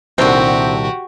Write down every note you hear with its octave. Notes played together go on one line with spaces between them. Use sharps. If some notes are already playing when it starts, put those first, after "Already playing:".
C2 A#2 D3 D#3 C4 F#4 G4 A5